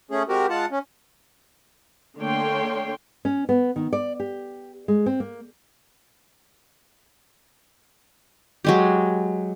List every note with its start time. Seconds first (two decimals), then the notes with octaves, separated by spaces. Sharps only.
0.11 A3 C#4 G#4
0.29 G#3 C4 F#4 G4 A#4
0.50 G#3 F4 F#5 A5
0.71 C#4
2.18 D3 A3 A#3 C#5 G5 C6
3.25 C#4
3.49 B3
3.76 D#3
3.93 D5
4.20 G4
4.88 G#3
5.06 C4
5.20 A#3
8.65 F#3 G#3 G4